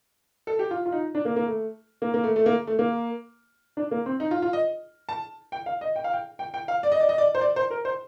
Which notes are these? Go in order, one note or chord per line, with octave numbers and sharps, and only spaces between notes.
A4
G4
F4
F4
D#4
D4
A#3
A#3
A3
A#3
A#3
A3
A3
A#3
A3
A#3
D4
A#3
C4
D#4
F4
F4
D#5
A5
G5
F5
D#5
G5
F5
G5
G5
G5
F5
D5
D#5
D5
D#5
D5
C5
D5
C5
A#4
C5